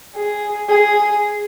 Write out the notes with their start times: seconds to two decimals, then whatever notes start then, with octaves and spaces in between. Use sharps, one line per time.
0.17 G#4
0.69 G#4